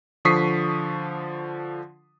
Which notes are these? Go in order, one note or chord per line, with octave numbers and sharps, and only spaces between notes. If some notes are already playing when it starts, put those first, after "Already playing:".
D3 F3 C#6 D#6 B6 C7